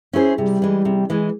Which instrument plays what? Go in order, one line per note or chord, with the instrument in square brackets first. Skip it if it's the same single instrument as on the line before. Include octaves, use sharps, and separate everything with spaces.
[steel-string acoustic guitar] C#4 E4 G#4 C5
[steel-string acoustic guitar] C3 [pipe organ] G3
[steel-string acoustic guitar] E3 G#3
C3
E3 G#3